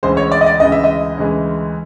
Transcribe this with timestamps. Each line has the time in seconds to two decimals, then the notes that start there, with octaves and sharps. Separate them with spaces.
0.03 D2 C#3 E3 G#3 C5
0.17 C#5
0.32 D5
0.41 D#5
0.46 D5
0.60 D2 C#3 E3 G#3 D#5
0.72 E5
0.84 D#5
1.17 D2 C#3 E3 G#3